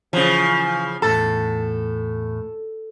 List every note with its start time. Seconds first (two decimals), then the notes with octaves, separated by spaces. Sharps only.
0.13 C#3 E3 F3
1.02 E2 A2 A4 A5